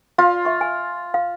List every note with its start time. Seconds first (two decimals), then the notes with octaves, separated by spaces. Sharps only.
0.18 F4 F5
0.45 E5 C#6
0.61 G#5
1.14 F5